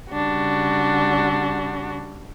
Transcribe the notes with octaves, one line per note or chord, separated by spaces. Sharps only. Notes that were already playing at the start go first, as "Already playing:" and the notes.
C#3 G3 D4 F#4